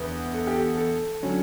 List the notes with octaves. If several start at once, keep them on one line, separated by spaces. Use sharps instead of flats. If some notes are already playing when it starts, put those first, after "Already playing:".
Already playing: E2 D3 B4
A4
G4
A4
A4
D3 F#3 C#4